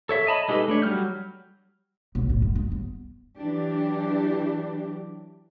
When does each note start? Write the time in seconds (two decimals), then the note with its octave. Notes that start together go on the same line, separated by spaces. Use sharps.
0.09 A4 C#5 E5
0.27 D#5 A5 B5
0.48 G#3 D#4 G4 A4 B4
0.68 A3 D4 C#5
0.82 F#3 G3 F6 G6
2.15 B1
2.29 A2
2.42 F#2
2.55 D#4
2.71 G1
3.38 E3 F#3 D4 G4